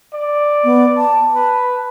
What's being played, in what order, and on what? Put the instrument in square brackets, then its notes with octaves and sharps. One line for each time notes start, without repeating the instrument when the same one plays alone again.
[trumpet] D5
[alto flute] B3
A5
[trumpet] B4